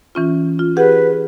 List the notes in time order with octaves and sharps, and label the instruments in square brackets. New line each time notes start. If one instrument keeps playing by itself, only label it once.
[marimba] E3 C#4 F4
F4
[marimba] G4 G#4 F#5 [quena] B4